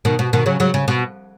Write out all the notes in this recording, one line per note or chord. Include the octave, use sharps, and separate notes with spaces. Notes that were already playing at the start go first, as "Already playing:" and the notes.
B2 D#3
B2
B2 D#3
C#3 F#3
C#3 F#3
C#3
B2